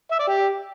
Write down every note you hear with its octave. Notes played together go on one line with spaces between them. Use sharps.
E5
D5
G4